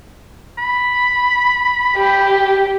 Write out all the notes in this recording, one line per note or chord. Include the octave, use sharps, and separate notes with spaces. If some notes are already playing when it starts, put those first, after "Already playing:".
B5
G4